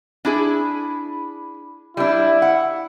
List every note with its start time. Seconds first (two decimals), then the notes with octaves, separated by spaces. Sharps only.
0.25 D4 E4 G#4
1.97 G3 D4 E4
2.42 F#5